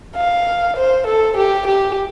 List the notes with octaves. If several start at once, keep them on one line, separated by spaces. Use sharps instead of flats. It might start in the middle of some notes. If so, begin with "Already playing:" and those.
F5
C5
A4
G4
G4